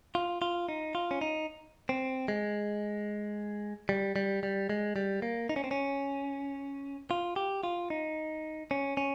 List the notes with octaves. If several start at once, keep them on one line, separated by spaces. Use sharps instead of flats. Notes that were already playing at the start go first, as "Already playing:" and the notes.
F4
F4
D#4
F4
C#4
D#4
C4
G#3
G3
G3
G3
G#3
G3
A#3
D#4
C#4
C4
C#4
F4
G4
F4
D#4
C#4
C#4